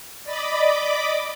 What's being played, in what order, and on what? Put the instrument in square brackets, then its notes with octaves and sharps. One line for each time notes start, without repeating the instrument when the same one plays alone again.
[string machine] D5 D#5 B5 D6